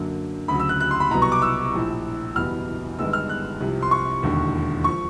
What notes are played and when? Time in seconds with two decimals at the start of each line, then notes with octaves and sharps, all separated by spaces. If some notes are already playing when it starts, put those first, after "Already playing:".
Already playing: F#2 D3 F#3 A#3
0.48 D2 C#3 F#3 B5
0.59 E6
0.69 F#6
0.80 F#6
0.91 C6
1.00 B5
1.10 C2 B2 F#3 B3 A#5
1.22 C#6
1.32 D6
1.42 E6
1.73 A#1 A2 F3
2.36 F#1 E2 B2 G3 B3 F6
2.99 G1 G2 D#3 G#3 B3 E6
3.13 F6
3.29 F#6
3.60 C2 C3 F3
3.82 C6
3.91 C#6
4.23 E1 D#2 D3
4.84 F3 C#6